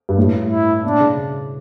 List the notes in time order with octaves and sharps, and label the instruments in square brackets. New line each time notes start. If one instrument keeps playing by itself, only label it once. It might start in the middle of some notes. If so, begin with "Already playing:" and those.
[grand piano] G2
A2
[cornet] E4
[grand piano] B2 [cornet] D4
[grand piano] C#3